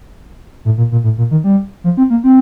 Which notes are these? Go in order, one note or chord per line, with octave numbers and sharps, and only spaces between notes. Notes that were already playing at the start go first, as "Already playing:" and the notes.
A2
A#2
A#2
A2
A#2
D#3
G3
F3
C4
A#3
C4